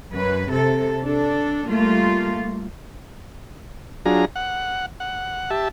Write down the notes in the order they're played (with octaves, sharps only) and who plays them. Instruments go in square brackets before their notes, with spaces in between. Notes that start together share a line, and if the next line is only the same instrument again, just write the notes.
[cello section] F#2 B4
C3 A4
D4 A4
G3 A3 A#3 F4
[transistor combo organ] F#3 D4 F4 G#4 A#5
F#5
F#5
G4 E5 A5